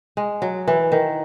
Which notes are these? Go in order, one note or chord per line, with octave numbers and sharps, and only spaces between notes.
G#3
F#3
E3
D#3